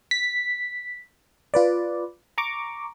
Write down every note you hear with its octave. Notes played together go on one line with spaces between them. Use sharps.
B6
F4 B4 D5
A#5 C#6 D6